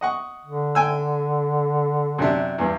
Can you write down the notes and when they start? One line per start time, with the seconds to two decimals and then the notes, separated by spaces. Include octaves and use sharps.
0.01 D#5 F#5 C#6
0.46 D3
0.75 G5 G#5 E6
2.18 F#2 C3 D4
2.58 E2 G2